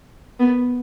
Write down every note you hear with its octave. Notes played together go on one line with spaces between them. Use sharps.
B3